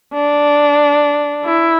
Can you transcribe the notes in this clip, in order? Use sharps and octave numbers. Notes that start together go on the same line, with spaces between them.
D4
E4